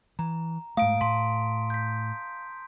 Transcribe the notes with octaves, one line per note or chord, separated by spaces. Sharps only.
E3 A#5
G#2 A3 F5 D#6 D7
A2 A5 C6 B6
G6 B6